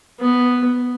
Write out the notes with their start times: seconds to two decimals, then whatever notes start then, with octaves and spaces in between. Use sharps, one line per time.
0.20 B3